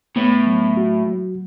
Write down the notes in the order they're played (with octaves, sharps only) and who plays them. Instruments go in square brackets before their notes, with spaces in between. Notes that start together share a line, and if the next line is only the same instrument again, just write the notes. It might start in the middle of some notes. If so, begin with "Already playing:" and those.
[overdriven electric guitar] A2 [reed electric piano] B3
[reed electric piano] F#3
F#4
F#3